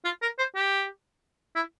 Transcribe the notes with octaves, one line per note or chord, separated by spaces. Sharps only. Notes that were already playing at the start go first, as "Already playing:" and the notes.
F4
A#4
C5
G4
E4